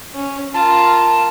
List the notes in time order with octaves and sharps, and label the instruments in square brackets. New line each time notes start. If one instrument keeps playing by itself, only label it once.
[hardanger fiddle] C#4
[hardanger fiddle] F4 A#4 [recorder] A5